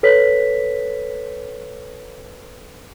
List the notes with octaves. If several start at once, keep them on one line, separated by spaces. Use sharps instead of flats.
A4 B4 C#5 B6